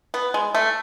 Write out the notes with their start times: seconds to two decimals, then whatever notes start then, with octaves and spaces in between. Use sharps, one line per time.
0.14 B3
0.34 G#3
0.55 A3